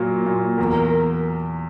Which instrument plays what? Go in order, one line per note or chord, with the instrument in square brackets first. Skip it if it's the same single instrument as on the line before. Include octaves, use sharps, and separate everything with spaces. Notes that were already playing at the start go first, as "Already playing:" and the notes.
Already playing: [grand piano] A#2 F#3 A#3
A#2
[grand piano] E2 [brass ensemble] A#4